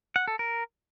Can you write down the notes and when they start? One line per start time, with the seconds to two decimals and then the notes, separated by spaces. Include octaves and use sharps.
0.16 F#5
0.28 A4
0.39 A#4